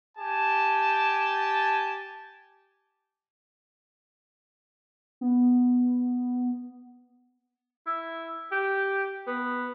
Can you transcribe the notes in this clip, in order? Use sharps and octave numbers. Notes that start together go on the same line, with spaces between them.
G4 G#5 A5
B3
E4
G4
B3